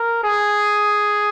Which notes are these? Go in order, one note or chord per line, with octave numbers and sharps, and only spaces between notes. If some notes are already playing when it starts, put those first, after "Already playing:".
Already playing: A#4
G#4